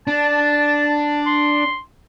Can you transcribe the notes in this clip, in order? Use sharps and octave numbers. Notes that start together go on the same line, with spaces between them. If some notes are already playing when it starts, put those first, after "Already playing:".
D4 A5
C6